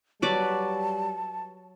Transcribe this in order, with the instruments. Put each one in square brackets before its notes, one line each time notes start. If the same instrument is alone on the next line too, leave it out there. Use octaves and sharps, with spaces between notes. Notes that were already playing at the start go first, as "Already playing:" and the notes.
[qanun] F#3 B4 D5 [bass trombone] G3 [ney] A5